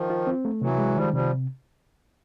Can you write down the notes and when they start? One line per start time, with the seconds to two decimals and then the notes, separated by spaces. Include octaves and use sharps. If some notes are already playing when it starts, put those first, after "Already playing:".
Already playing: D#3 F3
0.10 F4
0.27 C4
0.45 A3
0.61 C3 E3 F#3
0.78 G#3
0.95 D#3 F3 G3
1.13 C3 F3 G3